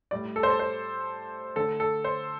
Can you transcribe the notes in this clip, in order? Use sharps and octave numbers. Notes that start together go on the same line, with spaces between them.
A2 G3 D5
A4
C5
A4
C5
D3 A3 A4
A4
C5